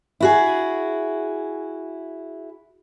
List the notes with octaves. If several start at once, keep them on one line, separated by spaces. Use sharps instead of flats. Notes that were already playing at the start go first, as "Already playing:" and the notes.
E4 F#4 G#4